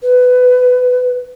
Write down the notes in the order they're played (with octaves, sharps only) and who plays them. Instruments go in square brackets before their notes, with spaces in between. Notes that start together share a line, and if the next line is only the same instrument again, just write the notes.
[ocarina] B4